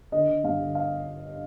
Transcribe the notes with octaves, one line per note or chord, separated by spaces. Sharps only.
D3 D#5
D3
G2 F5
D3
F5